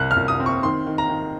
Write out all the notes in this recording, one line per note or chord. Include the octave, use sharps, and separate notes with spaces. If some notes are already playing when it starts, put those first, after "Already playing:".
Already playing: C2 F#6
F6
C2
D#6
C4
C#6
D#3 C6
D#3
A#5
D#3